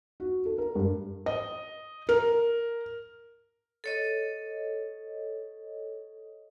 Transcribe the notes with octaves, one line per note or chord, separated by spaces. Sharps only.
F#4
A4
A#4
G2
D#5
A#4
A4 C#5 D#5